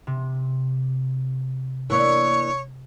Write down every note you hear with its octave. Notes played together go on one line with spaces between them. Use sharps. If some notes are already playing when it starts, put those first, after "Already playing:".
C3
E3 A#3 D4 C#5